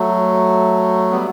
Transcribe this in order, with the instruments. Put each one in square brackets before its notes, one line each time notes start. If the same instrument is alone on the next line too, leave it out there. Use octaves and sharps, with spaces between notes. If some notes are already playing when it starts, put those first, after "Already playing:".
Already playing: [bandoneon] F#3 A3
G3 B3